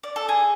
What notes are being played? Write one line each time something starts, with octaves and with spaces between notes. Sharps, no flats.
D5
A4
G#4